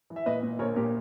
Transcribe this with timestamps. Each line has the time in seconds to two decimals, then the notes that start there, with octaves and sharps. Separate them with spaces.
0.10 E3
0.16 E5
0.26 A#2 B4 D#5
0.43 A#2
0.59 A#1 A#4 C#5
0.76 A#2 G4 A#4